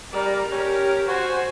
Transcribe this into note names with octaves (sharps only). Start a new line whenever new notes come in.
G3 A#4 D5 A#5
C#4 G4 A#4
F#4 C5 G#5